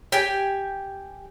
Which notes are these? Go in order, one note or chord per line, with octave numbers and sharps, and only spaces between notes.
G4 G5 G#5